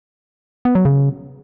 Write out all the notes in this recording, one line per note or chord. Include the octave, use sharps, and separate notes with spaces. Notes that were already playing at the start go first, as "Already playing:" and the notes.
B3
F#3
C#3